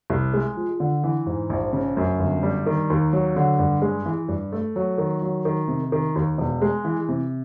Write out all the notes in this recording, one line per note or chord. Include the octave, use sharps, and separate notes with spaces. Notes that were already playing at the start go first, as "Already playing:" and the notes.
C2
G#3
F3
D3
E3
G#2
A#1
C#3
F#2
G1
G3
D#3
D#2
F#3
D3
G2
G#3
E3
G2
A3
F#3
D#3
F#3
D#3
C3
D#3
D#2
E1
G#3
E3
C3